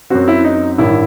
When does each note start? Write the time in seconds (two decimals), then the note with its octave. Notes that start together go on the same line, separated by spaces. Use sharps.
0.10 F#2 F#3 C4 F#4
0.28 E4
0.44 D#4
0.78 A1 G2 D#3 E4